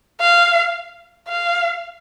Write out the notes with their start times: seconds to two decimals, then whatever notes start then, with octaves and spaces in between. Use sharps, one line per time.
0.20 F5
1.28 F5